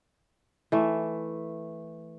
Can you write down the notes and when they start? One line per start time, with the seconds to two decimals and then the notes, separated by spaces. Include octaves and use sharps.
0.72 E3 A3